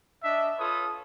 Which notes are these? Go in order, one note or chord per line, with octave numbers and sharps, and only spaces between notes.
D4 D#5 E5
F4 A4 B4 C#5 D#6